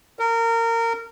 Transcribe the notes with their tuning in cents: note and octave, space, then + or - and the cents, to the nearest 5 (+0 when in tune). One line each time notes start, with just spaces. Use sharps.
A#4 -25